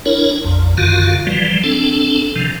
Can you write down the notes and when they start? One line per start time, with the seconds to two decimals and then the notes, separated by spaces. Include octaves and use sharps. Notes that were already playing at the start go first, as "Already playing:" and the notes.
0.06 D4 E4 A#4 C#5
0.44 A#1 F2
0.78 F#2 D3 D#3 F4 F#4 F5
1.27 E3 F3 G3
1.64 C4 D4 A4
2.36 C3 D#3 F3